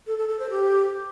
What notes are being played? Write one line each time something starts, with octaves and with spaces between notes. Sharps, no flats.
A4
A4
A4
C5
G4